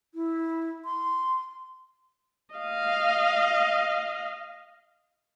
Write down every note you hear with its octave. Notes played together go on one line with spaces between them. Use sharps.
E4
C6
D#5 F5